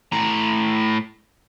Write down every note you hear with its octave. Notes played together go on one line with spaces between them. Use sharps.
A2 A#5